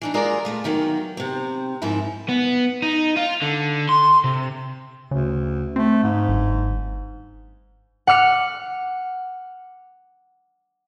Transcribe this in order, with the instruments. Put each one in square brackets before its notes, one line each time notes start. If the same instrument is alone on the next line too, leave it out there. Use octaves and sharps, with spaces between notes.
[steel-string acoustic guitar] E3 D4 D#4
G#3 A#3 F4 G#4 A#4 D5
A#2 A3 F4
E2 D#3 F#3 A#3
C3 C4
G#2 F3 A#3 E4
[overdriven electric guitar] B3
D#4
F4
D3
C6
C3
[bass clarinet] D2 [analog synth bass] C#3
[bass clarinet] A3 [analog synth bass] C4
[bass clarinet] G#2
[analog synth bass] G1
[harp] F#5 D6 F6 C#7